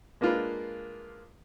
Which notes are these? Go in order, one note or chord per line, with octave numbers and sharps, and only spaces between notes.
G#3 A#3 D4 F4 A#4 B4